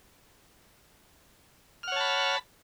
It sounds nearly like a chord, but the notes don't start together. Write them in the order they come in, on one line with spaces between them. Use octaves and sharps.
F6 F#5 C#5 A5 B5